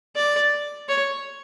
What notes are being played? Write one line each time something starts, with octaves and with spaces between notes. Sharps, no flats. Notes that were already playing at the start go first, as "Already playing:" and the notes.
D5
C#5